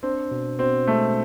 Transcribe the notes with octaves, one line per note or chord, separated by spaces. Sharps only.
C4 D4
B2
B2 C4
G#3 A3